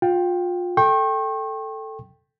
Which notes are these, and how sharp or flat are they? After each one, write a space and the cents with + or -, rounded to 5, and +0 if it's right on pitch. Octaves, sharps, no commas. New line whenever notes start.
F4 +30 G5 +0
A4 +0 G5 +0 C#6 -40